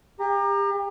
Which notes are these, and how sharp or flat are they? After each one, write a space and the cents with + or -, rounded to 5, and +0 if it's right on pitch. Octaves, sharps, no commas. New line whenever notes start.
G4 +35 A#5 +0